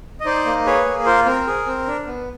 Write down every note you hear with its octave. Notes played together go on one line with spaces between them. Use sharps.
D#5
D#4 C5 D5
A#3
G#4 B4 C#5
A#3
F4 A#4 C5
C4 A#4
G#4
C4
D4
B3